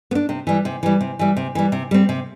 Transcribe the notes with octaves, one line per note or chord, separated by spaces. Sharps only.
B3
D4
C3
E3 G3
C3
E3 G3
C3
E3 G3
C3
E3 G3
C3
G3 C4
C3